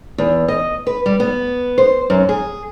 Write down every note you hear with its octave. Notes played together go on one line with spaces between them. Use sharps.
E2
D#5
B4
G3
B3
C5
F#2
G#4